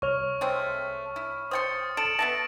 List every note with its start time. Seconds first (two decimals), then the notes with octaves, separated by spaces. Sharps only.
0.02 C2 C#5 C#6 F6 F7
0.41 G#3 A3 C4
1.16 E4
1.51 C5 G5 C6 D#6 A6 C#7
1.97 A4 D7 E7 F#7
2.19 B3 E5 A5 A#6